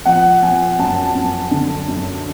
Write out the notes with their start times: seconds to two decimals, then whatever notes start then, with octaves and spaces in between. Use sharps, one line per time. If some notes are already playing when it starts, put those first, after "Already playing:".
0.05 F3 F#5
0.42 F3 G#5
0.79 F#2 A5
1.15 F#2
1.51 D3
1.88 F#2